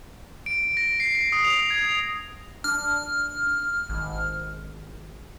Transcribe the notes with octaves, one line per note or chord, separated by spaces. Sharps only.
D7
A#6
C7
C7
D#6
F7
G#6
F7
D4 F6
G#1